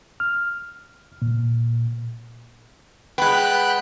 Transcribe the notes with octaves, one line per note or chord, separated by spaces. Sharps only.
F6
A#2
G#3 B3 G5 B5 F#6